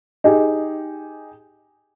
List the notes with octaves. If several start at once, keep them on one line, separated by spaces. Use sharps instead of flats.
D#4 G4 G#4